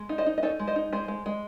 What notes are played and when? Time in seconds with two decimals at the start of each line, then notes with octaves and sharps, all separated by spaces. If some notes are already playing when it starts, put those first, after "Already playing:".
Already playing: G#3
0.09 D#4
0.18 C5 D#5
0.26 D#4
0.38 D#5
0.43 D#4 A4 C#5
0.59 G#3
0.67 C5 D#5
0.76 D#4
0.93 G#3 G#4 C5
1.08 G#3
1.26 G#3